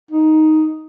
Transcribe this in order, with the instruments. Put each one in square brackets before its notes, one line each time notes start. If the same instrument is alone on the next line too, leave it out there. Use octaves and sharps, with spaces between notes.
[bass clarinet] D#4